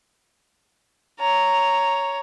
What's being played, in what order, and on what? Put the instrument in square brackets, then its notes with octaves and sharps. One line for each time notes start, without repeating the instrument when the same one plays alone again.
[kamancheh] C#5 A#5